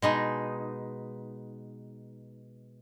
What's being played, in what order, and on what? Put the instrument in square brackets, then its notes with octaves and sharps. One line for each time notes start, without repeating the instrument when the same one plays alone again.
[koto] B2 G#3 D#4